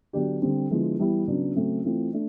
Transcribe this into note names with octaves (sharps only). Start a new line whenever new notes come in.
D3 F#3 B3 D4 G4
D3 G3 C4
D3 F3 G#3 B3 E4
E3 G3 B3 E4
C#3 F#3 B3 D4
C#3 F#3 A3 C4
E3 A3 C4 F4
A3 D4